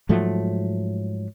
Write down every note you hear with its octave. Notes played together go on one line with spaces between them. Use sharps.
G#2 F3 F#3 A3